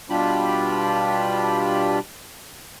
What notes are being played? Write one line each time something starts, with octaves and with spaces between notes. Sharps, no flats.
B2 G3 D4 F4 G4 B5